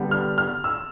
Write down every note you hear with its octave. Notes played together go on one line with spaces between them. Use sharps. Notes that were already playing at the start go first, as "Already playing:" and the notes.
Already playing: D3 G3 B3
F6
F6
E6